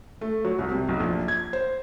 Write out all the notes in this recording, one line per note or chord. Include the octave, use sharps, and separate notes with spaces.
A3
F#3
C2
C3
B1
A#1
G#6
C5